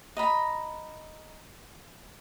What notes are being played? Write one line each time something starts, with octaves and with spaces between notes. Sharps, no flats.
D#5 A#5 B5